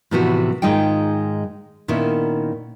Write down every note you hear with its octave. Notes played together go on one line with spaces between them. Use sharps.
A2 C3 E3 F3 B3 F#4
G#2 D#3 G#3 D#4 F4 G5
A#2 D#3 B3 C#4 E4